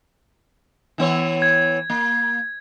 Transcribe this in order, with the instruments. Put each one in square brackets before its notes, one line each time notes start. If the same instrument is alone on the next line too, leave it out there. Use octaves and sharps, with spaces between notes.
[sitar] E3 B3 C#5
[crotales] G#6
[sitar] A#3